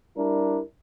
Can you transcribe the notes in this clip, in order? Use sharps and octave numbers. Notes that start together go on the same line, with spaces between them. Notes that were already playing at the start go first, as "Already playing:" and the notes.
G3 D4 E4 A#4